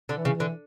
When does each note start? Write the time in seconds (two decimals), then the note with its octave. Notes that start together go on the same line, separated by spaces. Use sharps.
0.09 D3
0.15 E3
0.25 C#3
0.35 E3
0.40 D3